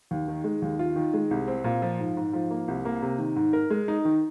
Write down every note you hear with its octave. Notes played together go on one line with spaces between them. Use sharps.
D#2
D#3
G#3
D#2
F4
D#3
G#3
C2
C4
A#2
F3
G#2
G#2
F3
A#3
C2
A#3
C3
D#3
G#2
A#4
G#3
D#4
D#3